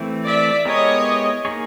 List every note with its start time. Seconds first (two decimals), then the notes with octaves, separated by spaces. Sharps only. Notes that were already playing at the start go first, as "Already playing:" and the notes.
Already playing: E3 A3 C4
0.26 D5 E5
0.65 G#3 B3 E4 G4 A#4 C#5 D#5
1.45 A#3 D#4 G#4 C#5